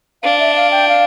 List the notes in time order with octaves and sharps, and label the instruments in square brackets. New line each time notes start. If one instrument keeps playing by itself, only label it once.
[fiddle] D4 [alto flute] F5
[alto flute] E5
F5
G5
F5